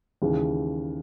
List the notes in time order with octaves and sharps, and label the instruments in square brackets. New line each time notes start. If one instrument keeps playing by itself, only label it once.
[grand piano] D#2 C#3 E3 G#3